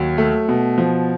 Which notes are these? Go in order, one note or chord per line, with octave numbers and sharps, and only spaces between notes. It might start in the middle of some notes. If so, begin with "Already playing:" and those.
Already playing: D#2 F#3
A3
B2
F3